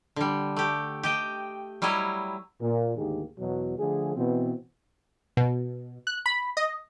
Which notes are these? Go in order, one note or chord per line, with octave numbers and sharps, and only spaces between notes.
D3 G3
A3 G4
G4 D#5 G5
F#3 G3 E4 C#5 D#5
A#2
D2 G#2 D#3 A#3 G4 G#4
E2 B2 F#3
D3 F3 A3 G#4
B2 E3 C4
B2
F#6
B5
D#5